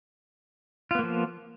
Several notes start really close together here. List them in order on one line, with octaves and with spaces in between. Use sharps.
F4 B3 A#3 F3